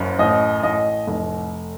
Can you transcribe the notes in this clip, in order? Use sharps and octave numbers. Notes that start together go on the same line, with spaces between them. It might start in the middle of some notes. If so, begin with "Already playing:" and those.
Already playing: F#1 F#2
A1 D#5
A1 D#5
F1